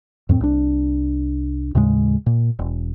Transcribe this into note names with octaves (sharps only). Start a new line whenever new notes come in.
F2 A2 C4
C2 D4
D#2 A2 C#3 G#3
A#2
E1